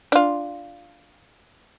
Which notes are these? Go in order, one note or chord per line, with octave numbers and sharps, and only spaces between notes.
D4 F4